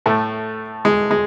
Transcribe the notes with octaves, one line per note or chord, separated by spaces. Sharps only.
A2 A3
G#3
G#3